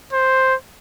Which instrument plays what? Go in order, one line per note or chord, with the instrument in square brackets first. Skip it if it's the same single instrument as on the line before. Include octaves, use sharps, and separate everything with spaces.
[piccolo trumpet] C5